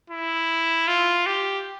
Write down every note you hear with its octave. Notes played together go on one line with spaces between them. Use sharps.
E4
F4
G4